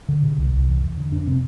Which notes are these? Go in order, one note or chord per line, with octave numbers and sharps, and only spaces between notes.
D3
B2
C2
C2
E2
E2
D3
F2 D4
C3 C4